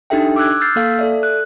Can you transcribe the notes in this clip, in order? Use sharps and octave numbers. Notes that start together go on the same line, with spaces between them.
D4 D#4 G4 A4 E5 G5
D6 E6 F#6 G#6
E6 F6 G6 A6 C7
A#3 A4 F5
A4 D5 E5
F#6